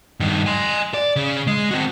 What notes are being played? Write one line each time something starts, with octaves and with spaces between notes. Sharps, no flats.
G2 D#3
G#5 C6
D5
C#3
G#3
C4 F#4